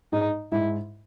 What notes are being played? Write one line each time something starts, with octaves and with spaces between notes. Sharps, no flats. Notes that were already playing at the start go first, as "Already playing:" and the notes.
G#2 G#3 D#4
G#2 G#3 E4